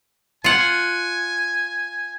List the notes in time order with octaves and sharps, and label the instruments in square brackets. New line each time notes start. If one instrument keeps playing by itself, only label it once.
[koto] F4 F#5 [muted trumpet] G#5